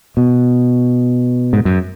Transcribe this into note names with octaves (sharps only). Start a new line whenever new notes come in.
B2
G#2
F#2